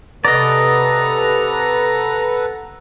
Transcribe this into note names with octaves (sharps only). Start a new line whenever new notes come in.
C3 A4 B4 D5 D#5 F#5 A#5